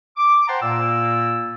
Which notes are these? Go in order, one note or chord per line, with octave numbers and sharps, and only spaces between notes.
D6
C5 F#5 G5 A5 A#5 C6
A#2 A#3 D5 E6